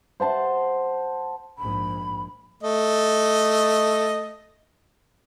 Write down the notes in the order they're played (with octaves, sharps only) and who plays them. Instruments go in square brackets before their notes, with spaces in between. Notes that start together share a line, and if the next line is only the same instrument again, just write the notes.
[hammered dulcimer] C5 F#5 A5 C6
[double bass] A#1 G#2 [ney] B5
[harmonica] A3 D#5